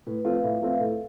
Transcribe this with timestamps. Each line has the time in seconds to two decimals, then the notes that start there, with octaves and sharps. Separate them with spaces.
0.07 A2 B4
0.25 F3 A3 C4 F4
0.34 F5
0.44 A2 E5
0.61 F3 A3 C4 F4
0.80 A2 A4